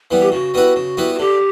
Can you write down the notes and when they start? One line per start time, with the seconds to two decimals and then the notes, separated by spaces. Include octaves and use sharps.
0.11 E3 G3 B3
0.21 G4
0.32 C#3 F#4
0.54 G3 B3 E4 B4
0.76 C#3
0.97 G3 B3 E4 B4
1.15 F#4
1.19 D3 G4